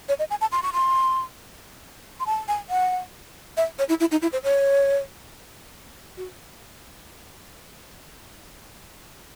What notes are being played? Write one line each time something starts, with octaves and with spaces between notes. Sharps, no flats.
C#5
D#5
G#5
A5
C6
C#6
C6
C6
A5
G#5
F#5
E5
C#5
E4
E4
D#4
E4
C5
C#5
F#4